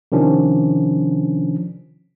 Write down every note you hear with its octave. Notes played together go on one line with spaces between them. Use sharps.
C3 D#3 F3 C#4 D4